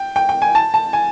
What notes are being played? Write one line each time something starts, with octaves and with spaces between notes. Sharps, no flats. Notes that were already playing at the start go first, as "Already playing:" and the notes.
Already playing: G5
G5
G5
G#5
A5
A5
G#5